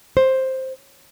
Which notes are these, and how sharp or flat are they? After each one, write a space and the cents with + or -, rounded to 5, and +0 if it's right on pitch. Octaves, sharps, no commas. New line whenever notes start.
C5 +5